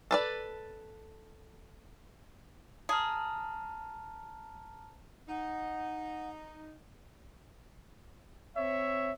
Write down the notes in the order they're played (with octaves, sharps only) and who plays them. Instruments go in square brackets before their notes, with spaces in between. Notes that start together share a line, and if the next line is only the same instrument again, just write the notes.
[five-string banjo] A4 B4 D5
[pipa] G#4 [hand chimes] A5 A#5 F6
[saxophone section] D#4 [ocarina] F#5
[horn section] C4 C#5 E5